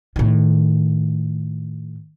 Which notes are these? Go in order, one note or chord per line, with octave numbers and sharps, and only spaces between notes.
A2 D#3